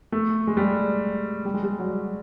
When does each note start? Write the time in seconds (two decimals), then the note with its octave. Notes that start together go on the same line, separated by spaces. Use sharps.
0.12 A3
0.47 G#3
0.57 G3
1.45 G3
1.54 G#3
1.63 G3
1.79 F#3